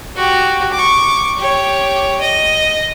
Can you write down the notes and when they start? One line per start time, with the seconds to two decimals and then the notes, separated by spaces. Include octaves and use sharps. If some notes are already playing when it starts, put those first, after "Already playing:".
0.16 F#4 G4
0.73 C#6 D6
1.39 G4 C#5
2.21 D#5